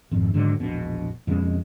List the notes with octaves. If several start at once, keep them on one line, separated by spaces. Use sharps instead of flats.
G#1 F2
G#2 D3 D#3 F#3
E1 A#1 B2
F2 B2 G#3 C#4